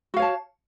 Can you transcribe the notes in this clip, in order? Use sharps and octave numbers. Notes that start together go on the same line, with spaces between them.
F#4 C#5 F5 A5